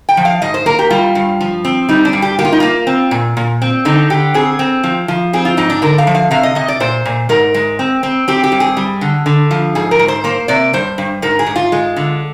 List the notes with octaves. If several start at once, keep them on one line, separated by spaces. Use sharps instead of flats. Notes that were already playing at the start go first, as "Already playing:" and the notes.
G5
F3
F5
G#2 D#5
C5
A#3 A#4
G4
G3 F4
G2
F3
C4
G3 D#4
D4
G2
G4
A#3 G4
F4
D#4
A#3 F4
C4
A#2
A#2
C4
D3 D#4
D3 G4
C4 G#4
C4
F3
F3
C4 G#4
F4
G#2 D#4
D4
D3 A#4
F5
F3
F5
C3 F5
D#5
C3 D#5
D5
A#2 C5
A#2
G#2 A#4
G#3
C4
C4
C4 G4
G4
G2
G#4
G3
D3
D3
F3
G#2 G#4
A#4
G#2
C5
A#3 C5
C3 D5
G2 C5
G2
G#2 A#4
G#4
G#2
F4
G#3
D3